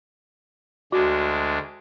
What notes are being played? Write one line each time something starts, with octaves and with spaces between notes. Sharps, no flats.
D2 G#3 D4 F#4